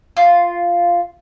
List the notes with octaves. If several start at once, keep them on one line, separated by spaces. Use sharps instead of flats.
F4